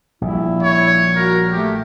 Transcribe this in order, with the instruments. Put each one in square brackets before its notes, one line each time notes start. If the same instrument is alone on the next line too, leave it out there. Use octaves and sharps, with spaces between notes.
[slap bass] A#1 G3 [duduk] E4
[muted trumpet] C#5
[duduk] F#4 [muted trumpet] A#4
[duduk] A3 [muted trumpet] G4